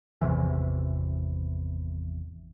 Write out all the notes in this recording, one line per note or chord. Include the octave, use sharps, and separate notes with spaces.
G#1 E2 C3 E3